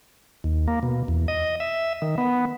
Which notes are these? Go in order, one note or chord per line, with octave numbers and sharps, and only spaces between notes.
D#2
A#3
B2
E2
D#5
E5
D#3
B3